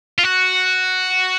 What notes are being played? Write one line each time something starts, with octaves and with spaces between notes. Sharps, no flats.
F4
F#4